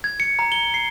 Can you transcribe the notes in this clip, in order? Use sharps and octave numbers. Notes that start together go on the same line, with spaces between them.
G#6
C#7
A#5
G7
C7